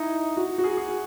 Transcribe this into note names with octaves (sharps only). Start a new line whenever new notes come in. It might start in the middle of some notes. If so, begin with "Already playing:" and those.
Already playing: D#4 E4
F#4
F#4
G#4
G#4